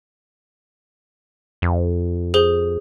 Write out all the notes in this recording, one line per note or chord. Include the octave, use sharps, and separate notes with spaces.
F2
G#4 C5 G7